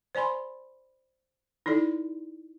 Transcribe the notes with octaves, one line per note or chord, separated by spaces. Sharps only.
C5 D5 G#5 B5 C6
D#4 E4 A4 D5